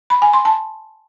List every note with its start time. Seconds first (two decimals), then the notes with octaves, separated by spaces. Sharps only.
0.10 B5
0.22 G#5
0.33 C6
0.45 A5